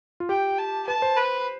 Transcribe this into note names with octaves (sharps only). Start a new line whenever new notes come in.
F4
G4 G5
A5
B4 A5
C5
B4